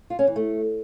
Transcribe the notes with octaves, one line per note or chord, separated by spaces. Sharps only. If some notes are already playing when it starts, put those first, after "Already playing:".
F4
C#4
E3
A3